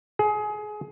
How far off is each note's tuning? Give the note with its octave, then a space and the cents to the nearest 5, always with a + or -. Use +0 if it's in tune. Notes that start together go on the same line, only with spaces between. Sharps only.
G#4 +25